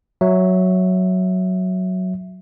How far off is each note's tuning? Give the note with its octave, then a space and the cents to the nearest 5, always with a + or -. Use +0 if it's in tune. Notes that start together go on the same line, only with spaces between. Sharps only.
F#3 +0 E5 +0